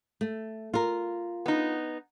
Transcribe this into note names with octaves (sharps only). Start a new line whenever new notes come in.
A3
F4 A#4
B3 D#4